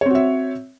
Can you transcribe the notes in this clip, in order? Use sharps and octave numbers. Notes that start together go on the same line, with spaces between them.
C4 F#4 C#5 E5